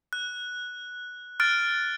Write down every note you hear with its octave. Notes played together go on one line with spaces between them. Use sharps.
F#6
F6 F#6 A6 D7